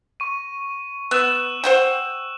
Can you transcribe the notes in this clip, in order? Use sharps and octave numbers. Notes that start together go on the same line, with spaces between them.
C#6 D#7
B3 E6 F#6 E7
C5 F#5 G5